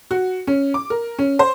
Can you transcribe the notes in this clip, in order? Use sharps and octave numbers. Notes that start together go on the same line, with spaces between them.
F#4
C#4
D6
A#4
C#4
C5